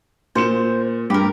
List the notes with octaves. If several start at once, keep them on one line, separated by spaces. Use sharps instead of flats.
A#2 C5 C#7 E7
G2 G4 A#4